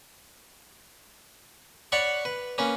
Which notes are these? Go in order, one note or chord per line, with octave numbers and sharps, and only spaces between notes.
C#5 D5 F#5 B5 C#6
B4
A#3 C#4 B4